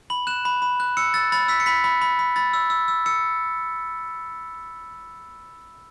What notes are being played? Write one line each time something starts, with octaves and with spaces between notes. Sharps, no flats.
B5 F#7
F#6 E7
B5
B5
F#6
E6 C#7
E6 A6
B5 A6
E6 B6
C#7
B5 B6
B5
B5
B5
B5 A6
E6
E6
E6
E6 C#7